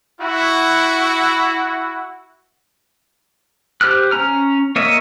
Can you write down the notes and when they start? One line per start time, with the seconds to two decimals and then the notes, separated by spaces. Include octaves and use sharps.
0.21 E4 F#4
3.81 G4 C5 F6 F#6
4.11 C#4 A#5 F6
4.76 A#3 A#4 C#5 D#5 E5